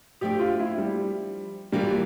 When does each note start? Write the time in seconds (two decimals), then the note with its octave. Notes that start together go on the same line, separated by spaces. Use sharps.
0.21 F3 A3 D4 G4
0.39 F4
0.59 E4
0.78 G3
1.72 E3 G3 A#3 F4